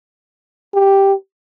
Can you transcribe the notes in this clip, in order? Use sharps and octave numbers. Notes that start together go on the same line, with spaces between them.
G4